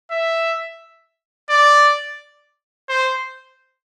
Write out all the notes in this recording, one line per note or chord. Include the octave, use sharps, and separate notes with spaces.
E5
D5
C5